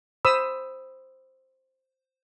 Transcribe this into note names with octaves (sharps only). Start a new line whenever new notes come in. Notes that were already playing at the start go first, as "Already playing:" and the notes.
C5 B5 D#6 E6